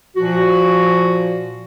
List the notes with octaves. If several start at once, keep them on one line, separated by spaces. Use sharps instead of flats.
A#2 F3 F#4